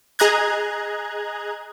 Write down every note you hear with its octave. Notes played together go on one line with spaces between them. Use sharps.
G#4 D#5 A#5 F#6 G#6